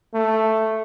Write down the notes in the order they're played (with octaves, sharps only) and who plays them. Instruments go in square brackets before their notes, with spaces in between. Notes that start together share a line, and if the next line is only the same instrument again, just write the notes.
[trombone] A3